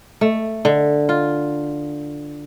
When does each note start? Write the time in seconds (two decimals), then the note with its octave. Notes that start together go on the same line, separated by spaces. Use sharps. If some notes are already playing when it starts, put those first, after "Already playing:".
0.21 A3
0.65 D3
1.09 F4